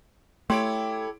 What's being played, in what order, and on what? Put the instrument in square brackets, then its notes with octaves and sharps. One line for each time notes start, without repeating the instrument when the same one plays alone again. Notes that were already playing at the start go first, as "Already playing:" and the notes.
[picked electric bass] A3 [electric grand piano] E4 C#5 D7 [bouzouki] G4 A4 [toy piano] G5 C6